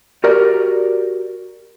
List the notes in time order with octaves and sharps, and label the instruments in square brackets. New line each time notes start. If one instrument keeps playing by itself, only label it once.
[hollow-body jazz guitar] F#4 G4 A#4 D5